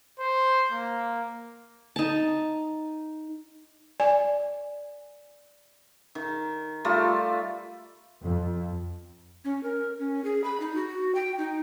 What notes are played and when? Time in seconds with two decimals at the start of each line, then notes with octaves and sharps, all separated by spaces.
0.19 C5
0.72 A#3
1.96 D#4 A5
4.00 D5 G#5
6.15 D#3
6.85 G3 A3 F4
8.21 F2
9.45 C#4
9.63 A#4
9.99 C#4
10.24 G#4
10.44 B5
10.60 D#4
10.76 F#4
11.15 G5
11.38 D#4